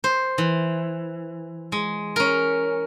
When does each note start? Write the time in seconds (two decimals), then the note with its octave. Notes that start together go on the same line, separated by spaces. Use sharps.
0.04 C5
0.38 E3
1.72 G#3
2.16 C#4 A#4